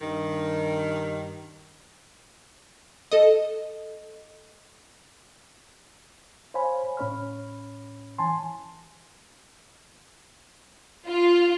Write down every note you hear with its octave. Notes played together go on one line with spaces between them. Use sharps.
G2 D#3
A4 D#5
C5 C#5 F5 G#5 B5
A2 C#4 C#5 B5 F6
E3 G#5 A5 C6
F4